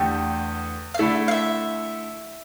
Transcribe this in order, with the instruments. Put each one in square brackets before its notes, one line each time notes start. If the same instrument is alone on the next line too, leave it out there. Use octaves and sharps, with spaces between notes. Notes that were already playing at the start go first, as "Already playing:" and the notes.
Already playing: [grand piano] E2 D3 A3 A4 [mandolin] G4
[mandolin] F5
[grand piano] D3 A3 E4 A4 [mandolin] E5
[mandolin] F5
E5